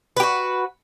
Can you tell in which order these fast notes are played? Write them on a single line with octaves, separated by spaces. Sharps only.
B4 G4 F#4